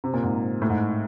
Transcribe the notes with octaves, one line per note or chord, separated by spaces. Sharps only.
C3
A#2
G#2
A2
G#2